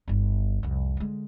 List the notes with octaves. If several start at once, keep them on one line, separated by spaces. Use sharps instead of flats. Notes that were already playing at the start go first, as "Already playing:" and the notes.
G1 D#4
C2 F2
D3 G#3